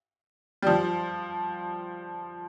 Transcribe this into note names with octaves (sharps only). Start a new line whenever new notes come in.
G3
F3